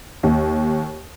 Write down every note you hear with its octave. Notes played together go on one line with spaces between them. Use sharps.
D#2